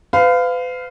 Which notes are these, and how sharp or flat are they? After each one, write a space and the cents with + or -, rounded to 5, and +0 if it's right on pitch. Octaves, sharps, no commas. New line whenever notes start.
B4 +40 F5 +0